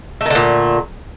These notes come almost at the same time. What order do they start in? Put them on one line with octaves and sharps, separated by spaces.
A3 D#3 D3 A#2